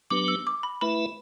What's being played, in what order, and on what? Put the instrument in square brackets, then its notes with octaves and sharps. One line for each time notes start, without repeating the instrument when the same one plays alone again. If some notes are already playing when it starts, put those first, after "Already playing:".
[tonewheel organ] F#3 B3 D4 G4 B4 [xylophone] D6
[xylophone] E6
D6
B5
[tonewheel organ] A3 E4 B4 E5 [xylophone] B5